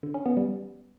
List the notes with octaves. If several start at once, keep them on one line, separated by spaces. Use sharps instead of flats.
D3
C#4
B3
G3